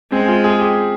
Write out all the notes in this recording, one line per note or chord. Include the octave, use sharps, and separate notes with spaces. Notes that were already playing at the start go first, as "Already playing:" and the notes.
G#3 C4
F4
G#4
G4